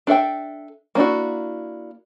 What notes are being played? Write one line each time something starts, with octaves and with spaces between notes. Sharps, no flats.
D4 A4 E5 G5
A#3 C#4 D4 E4 F#4